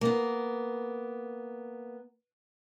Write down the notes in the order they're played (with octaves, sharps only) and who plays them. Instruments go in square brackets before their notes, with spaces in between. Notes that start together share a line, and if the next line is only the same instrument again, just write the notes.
[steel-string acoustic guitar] A#3 B3